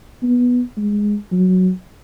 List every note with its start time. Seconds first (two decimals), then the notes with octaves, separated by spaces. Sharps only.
0.23 B3
0.77 G#3
1.32 F#3